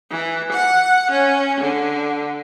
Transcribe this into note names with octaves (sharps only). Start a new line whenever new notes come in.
E3
F#5
C#4
D3